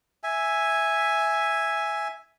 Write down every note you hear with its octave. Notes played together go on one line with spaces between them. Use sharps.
E5 G#5